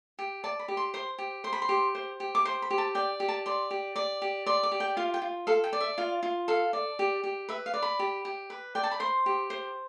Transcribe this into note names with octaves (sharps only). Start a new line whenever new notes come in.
G4
D5 A5
B5
G4
C6
C5 C6
G4
C5 C6
B5
C6
G4
C5
G4
D6
C5 C6
B5
G4
A5
D5 G5
G4
A5
D5 C6
G4
D5 D6
G4
D5 C6
D6
G4
G5
F4 F5
G5
F4
A4 F5
G5
D5
E5
F4 F5
F4
A4 F5
D5
G4
G4
B4 E5
F5
D5
B5
G4
G4
B4
D5 G5
A5
B5
C5 C6
G4
C5